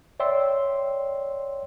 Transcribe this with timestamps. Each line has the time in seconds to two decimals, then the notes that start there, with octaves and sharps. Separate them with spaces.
0.20 C#5 D5 E5 G5 C6 E6